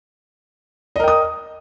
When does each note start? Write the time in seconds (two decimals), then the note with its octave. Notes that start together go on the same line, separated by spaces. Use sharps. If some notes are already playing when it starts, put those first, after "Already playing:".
0.96 D#5
1.00 A#4
1.04 G5
1.08 D#6